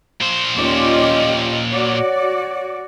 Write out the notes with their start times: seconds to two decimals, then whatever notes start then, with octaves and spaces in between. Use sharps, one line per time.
0.21 A#2 C5
0.56 D#2 C#4 F4 G4 D5 D#5
1.71 F#4 C#5 D5